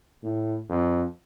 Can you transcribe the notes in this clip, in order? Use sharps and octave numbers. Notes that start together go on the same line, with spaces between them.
A2
F2